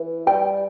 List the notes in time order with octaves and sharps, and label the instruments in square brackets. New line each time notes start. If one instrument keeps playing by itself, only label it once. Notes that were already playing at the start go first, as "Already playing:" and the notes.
Already playing: [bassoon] E3
[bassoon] G3 [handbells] G5